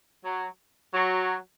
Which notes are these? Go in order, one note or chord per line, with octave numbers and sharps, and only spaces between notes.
F#3
F#3